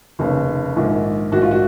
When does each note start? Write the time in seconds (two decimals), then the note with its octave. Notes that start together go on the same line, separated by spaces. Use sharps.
0.19 F1 D#2 C#3
0.76 A#1 G#2 D#3
1.32 A#1 G#2 D#3 F#4
1.42 F4
1.51 F#4